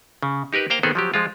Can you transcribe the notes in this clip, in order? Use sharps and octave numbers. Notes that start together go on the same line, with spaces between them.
C#3
D#4 G4 A#4 B4
A#3 C5 F5 G5 A#5
D#3 B3 C4 G#4 A4
F3 F#3 G4
F3 G#3 F4